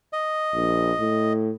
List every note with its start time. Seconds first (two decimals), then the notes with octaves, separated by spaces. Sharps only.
0.13 D#5
0.55 A#1
1.00 A2